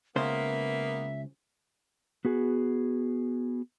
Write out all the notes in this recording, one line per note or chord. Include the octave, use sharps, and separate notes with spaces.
C#2 C#3 A#3 B3 C5 E5
B3 F#4 G#4